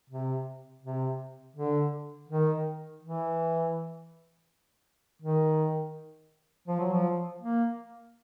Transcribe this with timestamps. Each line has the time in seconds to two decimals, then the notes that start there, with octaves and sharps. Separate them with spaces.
0.10 C3
0.83 C3
1.56 D3
2.29 D#3
3.03 E3
5.22 D#3
6.68 F3
6.80 F#3
6.93 F3
7.41 A#3